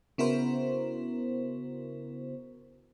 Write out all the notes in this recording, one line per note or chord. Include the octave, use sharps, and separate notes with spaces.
C#3 B3 E4 F#4 A#4 C5